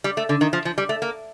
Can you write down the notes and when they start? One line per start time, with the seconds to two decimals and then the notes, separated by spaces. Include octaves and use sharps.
0.04 G3
0.17 A3
0.29 D3
0.41 D#3
0.53 F3
0.65 F3
0.78 G3
0.89 A3
1.02 A#3